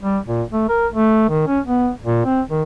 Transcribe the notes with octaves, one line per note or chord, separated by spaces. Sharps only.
G3
A#2
A3
A#4
A3
D#3
C#4
B3
A#2
C4
D#3